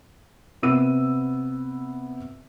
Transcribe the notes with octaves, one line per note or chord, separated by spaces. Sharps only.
C3 B3 E6 D#7